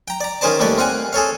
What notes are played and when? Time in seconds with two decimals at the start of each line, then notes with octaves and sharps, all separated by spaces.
0.08 G5 A#5
0.21 D5 A#5
0.41 D#3 C#4 G#4 C5 D5 A5
0.60 D#2 G3 A3 C#5 D5
0.78 C4 F5 F#5 G#5
1.13 G#4 A4 C#5 F5